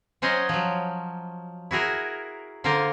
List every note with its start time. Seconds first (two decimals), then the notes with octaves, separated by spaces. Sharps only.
0.22 F#3 C#4 C5 D#5 F#5 G#5
0.49 F3 F#3
1.71 E4 F#4 G#4 A#4
2.64 D3 A#3 F4 A#4 C5